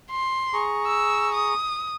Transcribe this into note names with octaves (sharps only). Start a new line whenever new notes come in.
C6
G#4 A#5 C#6
E6
D#6